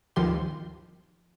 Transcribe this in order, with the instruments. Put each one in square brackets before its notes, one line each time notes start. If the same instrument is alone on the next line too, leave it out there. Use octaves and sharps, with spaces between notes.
[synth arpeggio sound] G1 D2 D#3 F3 G4 C6